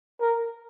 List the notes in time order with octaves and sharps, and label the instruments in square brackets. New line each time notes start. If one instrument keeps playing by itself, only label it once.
[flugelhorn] A#4